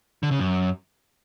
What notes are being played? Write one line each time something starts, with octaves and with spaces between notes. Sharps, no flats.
D3
C#3
F#2